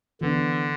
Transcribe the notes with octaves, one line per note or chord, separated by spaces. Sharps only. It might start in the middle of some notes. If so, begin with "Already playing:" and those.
D3 E3 B3 D4